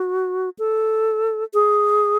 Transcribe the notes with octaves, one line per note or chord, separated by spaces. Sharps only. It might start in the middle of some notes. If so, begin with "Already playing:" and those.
Already playing: F#4
A4
G#4